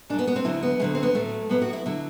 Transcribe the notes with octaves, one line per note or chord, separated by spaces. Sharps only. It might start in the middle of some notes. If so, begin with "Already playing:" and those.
F#2 F#3 B3 D4
B3
C4
D2 D3 F#3 E4
B3
D2 D3 F#3 A3
C4
B3
A2 F#3 A3
A2 F#3 B3
F#4
E4
D3 F#3 E4